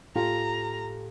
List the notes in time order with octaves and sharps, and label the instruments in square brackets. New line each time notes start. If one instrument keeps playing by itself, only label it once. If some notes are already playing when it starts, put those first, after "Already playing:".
[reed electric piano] A2 G4 A4 [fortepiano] F4 [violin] A#5